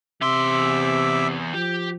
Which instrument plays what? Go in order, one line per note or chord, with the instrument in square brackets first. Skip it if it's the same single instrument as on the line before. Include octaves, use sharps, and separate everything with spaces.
[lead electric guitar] E2 C6 [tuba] C3 [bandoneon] E5 D6 E6
[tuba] F3 [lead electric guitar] G4